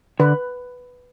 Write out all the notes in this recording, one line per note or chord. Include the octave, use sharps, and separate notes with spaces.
D3 B4